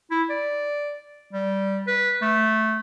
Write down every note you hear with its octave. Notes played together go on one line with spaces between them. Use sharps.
E4
D5
G3
B4
A3